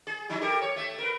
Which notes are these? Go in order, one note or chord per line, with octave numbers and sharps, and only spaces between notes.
G#4
F3 D#4 E4
G4 A4 A#4
C#5
A3 E5
A#4 B4